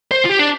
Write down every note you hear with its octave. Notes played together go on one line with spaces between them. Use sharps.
C5
F4
G4
D4